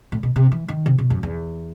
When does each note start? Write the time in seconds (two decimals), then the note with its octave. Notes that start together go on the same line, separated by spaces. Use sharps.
0.12 A2
0.23 B2
0.36 C3
0.52 E3
0.68 D#3
0.86 C3
0.98 B2
1.10 F#2
1.23 E2